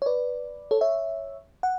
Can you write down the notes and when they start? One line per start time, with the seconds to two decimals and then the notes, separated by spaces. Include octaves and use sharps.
0.02 C#5
0.06 B4 D5
0.71 A4 C#5
0.81 C#5 E5
1.63 F#5